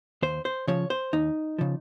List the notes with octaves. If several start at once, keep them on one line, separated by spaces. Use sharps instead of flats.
D#2 C5
C5
C#3 F3 C#5
C5
D#2 D#4
C#3 F3